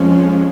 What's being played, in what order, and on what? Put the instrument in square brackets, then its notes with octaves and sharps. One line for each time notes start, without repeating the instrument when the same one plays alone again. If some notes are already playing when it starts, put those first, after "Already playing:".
Already playing: [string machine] F2 F3 G#3 [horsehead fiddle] C#4